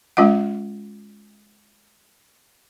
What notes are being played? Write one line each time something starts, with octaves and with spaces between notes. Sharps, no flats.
G#3 C#4 F4 D#5 F#5